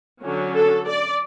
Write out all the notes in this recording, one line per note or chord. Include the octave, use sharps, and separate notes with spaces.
D3 F#3 C#4
A4
D5